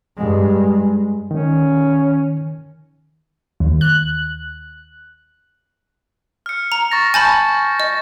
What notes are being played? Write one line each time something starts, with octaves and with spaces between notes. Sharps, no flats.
G2 G#3
D#3 C#4
D#2
F#6
F6 C#7
A#5
C#6 A6 A#6
G#5 A5 B5 C#6 G6 A6
D#5